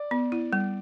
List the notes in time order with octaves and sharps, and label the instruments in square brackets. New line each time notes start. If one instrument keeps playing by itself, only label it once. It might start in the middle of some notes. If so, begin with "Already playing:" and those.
Already playing: [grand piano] D5
[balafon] B3
E4
G3